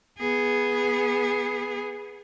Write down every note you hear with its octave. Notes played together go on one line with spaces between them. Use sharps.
B3 G#4